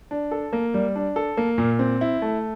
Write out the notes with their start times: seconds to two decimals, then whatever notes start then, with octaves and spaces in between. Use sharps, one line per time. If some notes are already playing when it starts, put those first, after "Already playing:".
0.11 D4
0.31 A4
0.53 A#3
0.74 G3
0.96 D4
1.16 A4
1.37 A#3
1.58 A#2
1.79 C4
2.01 E4
2.22 A3